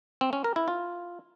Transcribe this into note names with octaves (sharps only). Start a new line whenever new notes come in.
C4
C#4
A#4
E4
F4